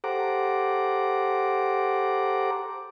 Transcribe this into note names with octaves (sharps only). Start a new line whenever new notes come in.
G4 A4 C5 F#5 A#5 D6